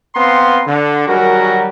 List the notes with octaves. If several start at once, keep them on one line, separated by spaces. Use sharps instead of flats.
B3 C4 F5 A#5 C6
D3
D#3 F#3 G3 F#4 G#4 A#4